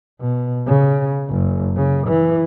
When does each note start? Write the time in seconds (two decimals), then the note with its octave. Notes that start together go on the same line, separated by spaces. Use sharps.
0.21 B2
0.67 C#3
1.30 F#1
1.76 C#3
2.08 E3